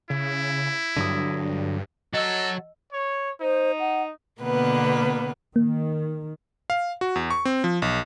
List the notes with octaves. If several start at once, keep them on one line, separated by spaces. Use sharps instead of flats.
C#3 E4
G2 D3 F#3 D#6
F#3 A4 D#5 A5 E6
C#5
D#4 C5
F#5
B2 D3 A#3 B3 B4
D#3 A#3
F5
F#4
E2
C#6
C4
F3
B1